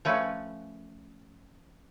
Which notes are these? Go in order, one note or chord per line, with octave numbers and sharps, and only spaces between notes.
F3 A3 C#4 B4